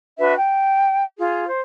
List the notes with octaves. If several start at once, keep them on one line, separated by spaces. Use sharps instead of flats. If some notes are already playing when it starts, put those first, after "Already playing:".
D4 F#4 B4 E5
G5
F4 G#4
C5